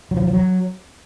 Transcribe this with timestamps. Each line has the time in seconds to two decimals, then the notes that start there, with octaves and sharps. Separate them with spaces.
0.11 F#3
0.17 F3
0.22 F#3
0.28 F3
0.33 F#3